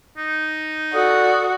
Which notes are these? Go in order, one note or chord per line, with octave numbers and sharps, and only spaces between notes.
D#4
F#4 A4 D5 D#6